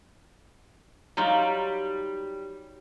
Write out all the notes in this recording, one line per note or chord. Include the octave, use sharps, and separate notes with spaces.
F#3 G3 D#4 F4